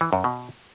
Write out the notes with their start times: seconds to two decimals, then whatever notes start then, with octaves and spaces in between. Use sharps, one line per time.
0.01 E3
0.13 F#2
0.24 B2